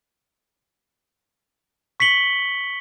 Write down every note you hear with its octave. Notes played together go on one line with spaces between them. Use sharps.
C#6 B6 C#7 F#7 G7